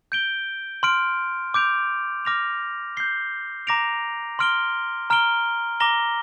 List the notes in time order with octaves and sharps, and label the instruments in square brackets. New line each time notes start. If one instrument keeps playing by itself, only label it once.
[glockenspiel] G6 D7 G7
C6 F6 D7
D6 G6 D7 F7
D6 F6 A#6 F7
G6 C7 G7
A#5 D6 A#6 D7 F7
C6 F6 D7 G7
A#5 F6 D7 G7
A#5 D6 A#6 G7